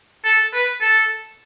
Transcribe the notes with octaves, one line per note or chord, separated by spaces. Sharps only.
A4
B4
A4